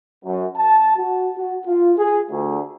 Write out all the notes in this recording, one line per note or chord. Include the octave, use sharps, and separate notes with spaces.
F#2
A5
F#4
F#4
F4
G#4
D2